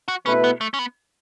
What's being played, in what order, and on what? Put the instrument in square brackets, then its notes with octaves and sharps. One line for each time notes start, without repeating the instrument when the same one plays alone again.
[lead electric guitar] F#4
[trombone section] B2 A3 E4 B4 [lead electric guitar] C#4
[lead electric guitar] B3
A3
C#4
B3